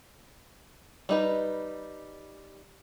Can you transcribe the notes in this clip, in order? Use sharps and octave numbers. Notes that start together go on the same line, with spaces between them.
G3 D#4 B4